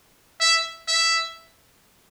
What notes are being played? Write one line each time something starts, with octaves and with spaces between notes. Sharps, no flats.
E5
E5